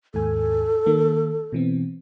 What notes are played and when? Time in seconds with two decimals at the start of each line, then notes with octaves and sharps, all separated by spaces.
0.14 D#2 G#2 A4 G#5
0.86 D#3 A#3
1.52 B2 E3 C4